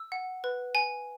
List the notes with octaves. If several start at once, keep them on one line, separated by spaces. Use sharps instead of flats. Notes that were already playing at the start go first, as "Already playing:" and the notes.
Already playing: E6
F#5
B4
G#5